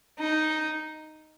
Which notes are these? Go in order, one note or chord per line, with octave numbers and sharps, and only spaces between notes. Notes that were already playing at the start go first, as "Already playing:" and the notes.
D#4